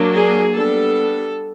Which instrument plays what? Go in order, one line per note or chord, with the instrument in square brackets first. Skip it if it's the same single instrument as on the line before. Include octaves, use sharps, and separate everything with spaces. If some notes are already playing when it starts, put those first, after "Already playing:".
Already playing: [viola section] F#3 A#3 D4
G#4
G3 B3 D4 A4